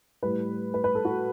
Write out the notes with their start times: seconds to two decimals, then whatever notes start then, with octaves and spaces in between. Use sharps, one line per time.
0.23 A2 G3 B4
0.74 B4
0.84 B4
0.95 A4
1.05 F#4